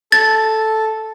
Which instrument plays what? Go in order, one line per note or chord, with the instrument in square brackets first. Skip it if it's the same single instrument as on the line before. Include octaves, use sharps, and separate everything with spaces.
[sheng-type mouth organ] A4 [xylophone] A6